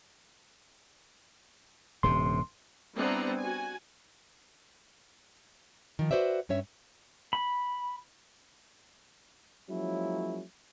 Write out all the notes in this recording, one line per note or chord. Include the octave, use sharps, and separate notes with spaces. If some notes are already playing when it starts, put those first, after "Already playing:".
D#1 G2 C3 C6
G3 B3 C4 D4 E4 A#5
F#4 G#5
D#3 F3
F#4 B4 C5 D5 E5
G2 C#4 C#5 E5
B5
F3 F#3 G#3 A#3 C#4 E4